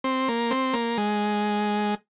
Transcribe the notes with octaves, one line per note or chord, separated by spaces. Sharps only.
C4
A#3
C4
A#3
G#3